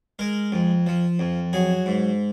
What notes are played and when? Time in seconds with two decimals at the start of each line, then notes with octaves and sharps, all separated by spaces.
0.19 G#3 A#4
0.52 F2
0.87 F3
1.19 F2
1.53 F#3 G#4
1.86 G#2